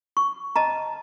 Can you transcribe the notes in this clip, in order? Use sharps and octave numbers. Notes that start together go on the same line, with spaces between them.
C#6
D#5 A5 A#5